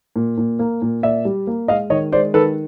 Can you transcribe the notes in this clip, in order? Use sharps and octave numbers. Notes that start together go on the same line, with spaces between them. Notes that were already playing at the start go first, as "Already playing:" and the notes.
A#2
A#2
A#3
A#2
A#2 D5 E5
G3
A#3
G#3 D#5 F5
D#3 C#5 D#5
G#3 C5 D5
D#3 A4 B4